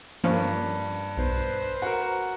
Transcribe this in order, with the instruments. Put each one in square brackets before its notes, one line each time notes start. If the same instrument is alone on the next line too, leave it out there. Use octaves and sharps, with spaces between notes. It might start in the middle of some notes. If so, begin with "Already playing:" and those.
[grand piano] G2 [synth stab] F3 A#3 C#4
[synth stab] B1 [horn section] B4 C5
[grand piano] F#4 A#4